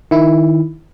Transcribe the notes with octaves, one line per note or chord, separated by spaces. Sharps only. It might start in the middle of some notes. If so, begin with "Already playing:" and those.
D#3 E4